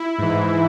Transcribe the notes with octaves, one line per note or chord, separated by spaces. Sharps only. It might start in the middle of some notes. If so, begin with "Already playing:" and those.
Already playing: E4
G#2 E3